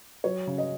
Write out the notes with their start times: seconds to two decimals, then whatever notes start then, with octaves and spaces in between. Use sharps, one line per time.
0.24 F#3 C#5
0.47 C#3
0.58 D#5